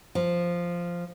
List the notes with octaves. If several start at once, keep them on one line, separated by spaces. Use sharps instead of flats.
F3